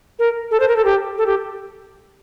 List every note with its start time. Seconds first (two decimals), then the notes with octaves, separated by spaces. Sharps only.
0.19 A#4
0.51 A4
0.60 C5
0.68 A#4
0.76 A4
0.85 G4
1.18 A4
1.26 G4